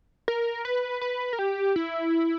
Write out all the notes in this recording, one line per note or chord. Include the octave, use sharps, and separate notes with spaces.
A#4
B4
B4
A#4
G4
E4